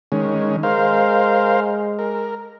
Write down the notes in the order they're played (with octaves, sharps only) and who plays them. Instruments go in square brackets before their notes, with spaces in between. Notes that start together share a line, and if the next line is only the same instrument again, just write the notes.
[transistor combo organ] D#3 G#3 C#4
[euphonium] G#3 [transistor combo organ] A#4 C5 F5
[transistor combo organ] A#4